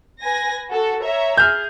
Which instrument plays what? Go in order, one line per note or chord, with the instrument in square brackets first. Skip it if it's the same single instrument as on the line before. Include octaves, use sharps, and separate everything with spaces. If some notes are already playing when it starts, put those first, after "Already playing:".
[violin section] B4 G#5 A#6
F#4 A4
C#5 E5 A#5
[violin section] G#4 [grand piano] F6 G6